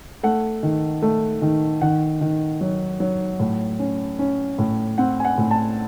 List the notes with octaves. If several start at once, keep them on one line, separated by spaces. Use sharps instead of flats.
A3 F#5
D#3
A3
D#3
D#3 F#5
D#3
F#3
F#3
A2
C#4
C#4
A2
C4 F#5
G#5
F#5
A2
A5